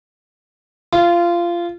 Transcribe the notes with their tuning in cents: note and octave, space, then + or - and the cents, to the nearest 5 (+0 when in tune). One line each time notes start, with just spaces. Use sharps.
F4 -20